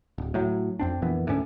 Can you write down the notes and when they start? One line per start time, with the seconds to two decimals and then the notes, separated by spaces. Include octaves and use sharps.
0.18 D1
0.34 A2 F#3
0.79 F2 C4 D4
1.02 F2 A#2 E3 B3
1.27 D2 G#2 D3 C#4